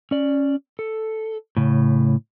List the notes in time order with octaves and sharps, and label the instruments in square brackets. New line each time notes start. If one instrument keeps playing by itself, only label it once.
[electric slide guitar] C#4 D5
A4
A2 C#3